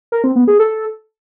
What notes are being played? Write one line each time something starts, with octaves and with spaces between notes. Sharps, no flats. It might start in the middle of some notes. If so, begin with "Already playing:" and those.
A#4
C4
B3
G#4
A4